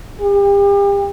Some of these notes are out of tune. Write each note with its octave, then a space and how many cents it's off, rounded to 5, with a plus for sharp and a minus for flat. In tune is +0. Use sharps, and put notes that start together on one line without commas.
G4 +35